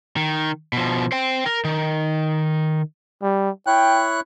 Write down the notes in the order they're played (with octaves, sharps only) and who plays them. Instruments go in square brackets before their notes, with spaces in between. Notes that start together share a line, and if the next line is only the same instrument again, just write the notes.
[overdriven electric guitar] D#3
B2 F3
C5 G5
A#4
D#3
[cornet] G3
[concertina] E4 C#5 F#6 [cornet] G5